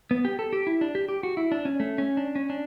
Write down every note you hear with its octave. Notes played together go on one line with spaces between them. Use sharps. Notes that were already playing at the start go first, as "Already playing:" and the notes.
B3
G4
A4
G4
E4
D4
G4
G4
F#4
E4
D4
C#4
A3
C#4
D4
C#4
D4